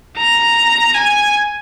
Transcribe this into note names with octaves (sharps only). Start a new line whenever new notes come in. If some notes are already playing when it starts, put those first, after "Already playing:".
A#5
G#5